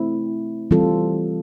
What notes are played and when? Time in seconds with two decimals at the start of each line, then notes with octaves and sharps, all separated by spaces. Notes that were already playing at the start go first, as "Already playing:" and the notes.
Already playing: A3 C4 E4
0.71 E3 G3 C4 F4 A4